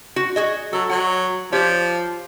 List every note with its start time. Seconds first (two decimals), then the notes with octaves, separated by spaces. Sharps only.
0.16 F#4
0.36 F#4 G#4 D#5
0.73 F#3 A4
0.90 F#3 F#5
1.52 F3 G4 C#5